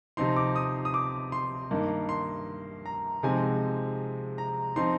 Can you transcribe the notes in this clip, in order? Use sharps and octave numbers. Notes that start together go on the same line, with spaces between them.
C3 F3 C4 D#4 C6
D6
D#6
D#6
D6
C6
G2 D#3 A#3 D#4
C6
A#5
C3 F3 G#3 C4 D#4 G#5
A#5
F3 C4 D#4 C6